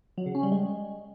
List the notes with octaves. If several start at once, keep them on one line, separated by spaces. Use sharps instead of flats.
F#3
C#3
C#4
G3
G#3